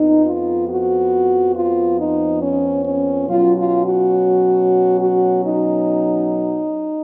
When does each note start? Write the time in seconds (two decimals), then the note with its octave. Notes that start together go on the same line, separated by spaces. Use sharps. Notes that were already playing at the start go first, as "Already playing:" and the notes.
Already playing: F2 F3 B3 D#4
0.25 F4
0.69 F#4
1.55 F4
1.98 D#4
2.42 C#4
2.84 C#4
3.28 B2 F#3 C#4 F4
3.57 F4
3.86 F#4
5.01 F#4
5.44 D#4